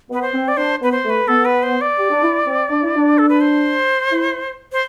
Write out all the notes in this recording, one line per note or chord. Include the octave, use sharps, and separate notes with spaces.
B3 B4
C5
C4
D5
D4 C5
B3 B4
C5
A3
B4
B3 A4
B4
C5
D5
G4
D4
E4
C4
D4
E4
D4
A4
B4
C5
E4
C5